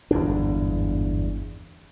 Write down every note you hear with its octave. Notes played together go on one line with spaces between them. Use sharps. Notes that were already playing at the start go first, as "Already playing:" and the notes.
G1 E2 G#2 D4